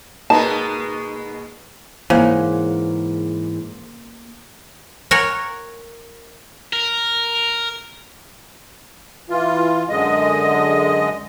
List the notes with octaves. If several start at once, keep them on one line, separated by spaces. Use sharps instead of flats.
B2 G#3 A#3 D#4 B4 A5 A#5
G#2 C#3 E3 A#3 C5 F#5
A#4 C#5 F#5 G#5
A#4
E3 F4
F#2 D3 G#3 D#5